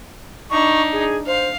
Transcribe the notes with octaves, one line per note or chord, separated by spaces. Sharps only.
D4 D#4 C#6
G#4
C5 F5